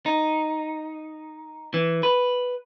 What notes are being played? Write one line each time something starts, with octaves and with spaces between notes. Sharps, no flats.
D#4
E3
B4